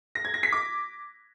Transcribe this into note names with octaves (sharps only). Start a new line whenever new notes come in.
A#6
G#6
A#6
B6
D6